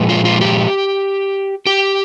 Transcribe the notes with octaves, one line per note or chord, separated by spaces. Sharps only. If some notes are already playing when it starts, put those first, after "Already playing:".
Already playing: A#2 F3 G#3
F4
F4
G4
G4